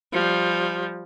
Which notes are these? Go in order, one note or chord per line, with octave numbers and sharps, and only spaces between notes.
F3 G3